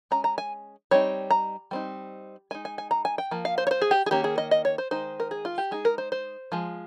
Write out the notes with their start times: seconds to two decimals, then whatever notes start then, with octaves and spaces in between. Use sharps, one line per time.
0.11 G#3 C#4 A#5
0.24 A#5
0.38 G#5
0.91 G3 C4 D#4 C#5
1.31 A#5
1.71 G3 C4 D#4
2.51 G#3 D#4 G#5
2.65 G#5
2.78 G#5
2.91 A#5
3.05 G#5
3.18 G5
3.31 F3 A#3
3.45 F5
3.58 C5
3.67 C#5
3.71 C5
3.82 G#4
3.91 G4
4.06 G#4
4.11 D#3 A#3 C#4 G4
4.24 G#4
4.38 D#5
4.51 D#5
4.65 C#5
4.78 C5
4.91 D#3 G#3 D#4 C5
5.20 A#4
5.31 G#4
5.45 F4
5.58 G4
5.71 G#3 D#4 G#4
5.85 A#4
5.98 C5
6.12 C5
6.52 F3 G#3